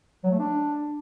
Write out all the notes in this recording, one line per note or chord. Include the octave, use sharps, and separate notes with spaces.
F#3
A3
D4